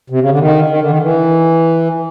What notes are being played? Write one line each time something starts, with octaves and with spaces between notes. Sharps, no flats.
C3
C#3
D3
D#3
D#3
D3
D#3
E3